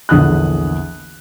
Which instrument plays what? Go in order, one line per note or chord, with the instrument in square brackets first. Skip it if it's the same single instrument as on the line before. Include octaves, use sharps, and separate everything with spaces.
[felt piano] A#1 E2 D3 D#6 F#6